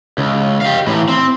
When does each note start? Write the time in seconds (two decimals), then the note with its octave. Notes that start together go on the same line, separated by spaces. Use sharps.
0.18 C#2
0.61 G4 F5
0.87 A2 E3
1.08 C4